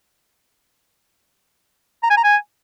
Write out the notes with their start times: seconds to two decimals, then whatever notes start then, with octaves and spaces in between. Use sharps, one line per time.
2.03 A#5
2.10 G#5
2.17 A#5
2.24 G#5